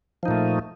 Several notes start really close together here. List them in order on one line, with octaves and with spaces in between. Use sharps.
F3 D#4 A#2 A3